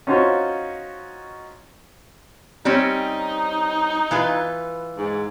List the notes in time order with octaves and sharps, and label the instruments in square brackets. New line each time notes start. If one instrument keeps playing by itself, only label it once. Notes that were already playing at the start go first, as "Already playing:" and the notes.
[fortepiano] C#4 D#4 F4 F#4 C5 C#5
[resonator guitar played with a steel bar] G3 C4 C#4 [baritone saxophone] D#4
[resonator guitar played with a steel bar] E3 F4 B4
[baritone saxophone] G#2